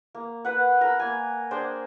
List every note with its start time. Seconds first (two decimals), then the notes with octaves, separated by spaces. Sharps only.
0.15 A#3
0.45 B4 F#5
0.81 A#4 B5
0.99 A#3 G#5
1.51 D4 G#4 C5 G5